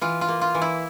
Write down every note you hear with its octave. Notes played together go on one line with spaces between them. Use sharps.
E3 F4
F4
A#3
F4
E3
E4